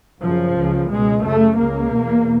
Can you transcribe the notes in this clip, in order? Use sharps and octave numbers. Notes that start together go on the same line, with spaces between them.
F#2 C#3 F3
C#2 C#3
C#2 B2 G#3
F#2 C#3 A3
C#2 C#3 A#3
E2 B2